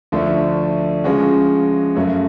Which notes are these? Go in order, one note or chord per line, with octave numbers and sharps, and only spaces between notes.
D2 D3 F3 A3 D4
C#3 F3 G#3 C#4 F#4
F#2 C#3 F#3 A3